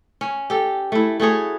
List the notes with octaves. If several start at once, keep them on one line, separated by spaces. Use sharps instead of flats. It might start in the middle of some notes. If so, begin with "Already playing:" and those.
C#4
G4 A4
A3 E4
A3 F#4 G#4 C#5